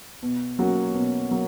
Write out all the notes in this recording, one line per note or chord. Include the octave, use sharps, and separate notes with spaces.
B2
F#3 A#3 C#4 F#4
B2
F#3 A#3